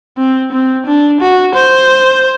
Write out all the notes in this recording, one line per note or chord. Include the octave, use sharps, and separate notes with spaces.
C4
C4
D4
F#4
C5